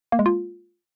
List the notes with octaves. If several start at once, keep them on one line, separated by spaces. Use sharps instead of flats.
A#3
G#3
F4